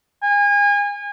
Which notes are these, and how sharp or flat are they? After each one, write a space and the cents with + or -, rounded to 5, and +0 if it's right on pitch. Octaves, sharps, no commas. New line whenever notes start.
G#5 -35